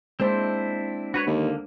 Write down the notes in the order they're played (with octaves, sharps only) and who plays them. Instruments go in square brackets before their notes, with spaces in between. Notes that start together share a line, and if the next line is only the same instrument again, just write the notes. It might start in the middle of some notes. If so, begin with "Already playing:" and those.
[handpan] G#3 A#3 C5 [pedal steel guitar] C4 D4 E4
[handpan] D4 [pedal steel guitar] F#4 B4 C#5
[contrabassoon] D#2 [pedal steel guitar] D3 A#3